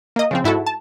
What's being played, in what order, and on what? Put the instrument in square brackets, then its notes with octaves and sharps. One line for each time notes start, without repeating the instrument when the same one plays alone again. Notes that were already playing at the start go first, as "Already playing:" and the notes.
[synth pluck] A#3 D#5
C#3 F3 C4
G#2 E4 F#4 A4
A5